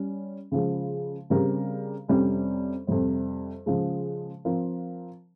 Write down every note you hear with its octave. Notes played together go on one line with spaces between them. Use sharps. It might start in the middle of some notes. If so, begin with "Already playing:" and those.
Already playing: G3 C#4
C#3 F3 G#3
C#3 G3 C4 G4 A#4
F2 C3 G3 C#4
F2 C3 G3 C4
C#3 F3 G#3
F3 C4 F4 A#4